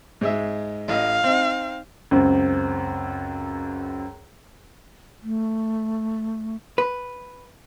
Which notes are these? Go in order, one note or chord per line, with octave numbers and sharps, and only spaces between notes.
G#2 G#3 E5
A1 D#5 F5
C4 D#4
C#2 F#2 C4
A3
B4